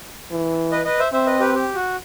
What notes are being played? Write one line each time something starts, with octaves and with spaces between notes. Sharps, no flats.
E3
B4 D#5
B4 D#5
C5 E5
C4 C5 E5
B4 D#5
G4 B4
G4
F#4